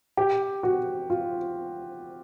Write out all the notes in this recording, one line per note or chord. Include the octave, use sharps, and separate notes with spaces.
G4
F#4
F4